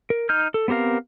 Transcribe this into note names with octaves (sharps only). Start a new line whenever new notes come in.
A#4
D#4 F6 G6
A4
B3 C4 G4 A#4 F5